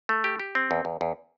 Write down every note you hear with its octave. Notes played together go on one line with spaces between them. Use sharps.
A3
G4
G4
C4
E2
E2
E2